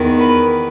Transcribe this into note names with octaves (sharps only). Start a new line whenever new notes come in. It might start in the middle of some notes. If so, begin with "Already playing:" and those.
Already playing: E2 D#3
B4